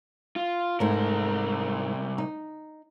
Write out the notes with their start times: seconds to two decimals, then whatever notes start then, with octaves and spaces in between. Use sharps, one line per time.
0.36 F4
0.80 C2 G#2 A3 A#4
2.18 D#4